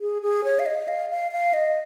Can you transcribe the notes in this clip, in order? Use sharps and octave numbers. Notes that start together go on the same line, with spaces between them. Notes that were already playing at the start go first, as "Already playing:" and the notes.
G#4
G#4
C#5
F5
D#5
F5
F5
F5
D#5